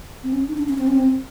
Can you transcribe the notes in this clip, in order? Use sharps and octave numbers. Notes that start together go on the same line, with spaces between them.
C4
C#4
D#4
D4
C#4
C4
C#4
C4